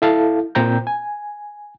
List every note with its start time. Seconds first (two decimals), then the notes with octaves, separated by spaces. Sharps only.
0.02 E4 A4 F5 A5
0.55 A#2 C4 G5 A#5 G6
0.87 G#5